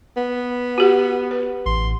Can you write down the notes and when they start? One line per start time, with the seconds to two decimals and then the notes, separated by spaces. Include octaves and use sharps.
0.17 B3
0.78 F#4 G4 F#5
1.31 B4
1.66 A1 C6